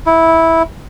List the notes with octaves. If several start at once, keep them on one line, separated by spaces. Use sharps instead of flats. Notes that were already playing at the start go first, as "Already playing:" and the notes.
E4